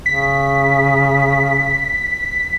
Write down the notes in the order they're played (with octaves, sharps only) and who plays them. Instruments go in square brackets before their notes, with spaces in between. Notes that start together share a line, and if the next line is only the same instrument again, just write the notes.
[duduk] C#3 [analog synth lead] B6